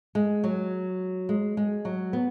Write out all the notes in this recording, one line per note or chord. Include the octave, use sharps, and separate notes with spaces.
G#3
F#3
G#3
G#3
F#3
B3